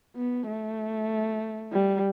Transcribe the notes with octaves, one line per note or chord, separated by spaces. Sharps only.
B3
A3
G3